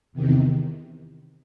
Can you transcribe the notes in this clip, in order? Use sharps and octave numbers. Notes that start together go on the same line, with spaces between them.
E2 C3 D#3